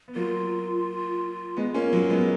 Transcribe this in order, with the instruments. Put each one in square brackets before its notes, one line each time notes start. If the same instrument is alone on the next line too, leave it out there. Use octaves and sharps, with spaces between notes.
[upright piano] B3
[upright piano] F#3 A#3 [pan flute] F4
[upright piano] G#3 B3
A#3 C#4
F#3 A#3
G#3 B3